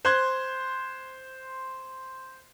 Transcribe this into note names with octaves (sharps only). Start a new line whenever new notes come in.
C5 C6 F#6 G#6